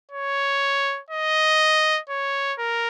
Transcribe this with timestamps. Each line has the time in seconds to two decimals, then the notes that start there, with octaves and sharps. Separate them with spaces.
0.11 C#5
1.10 D#5
2.09 C#5
2.59 A#4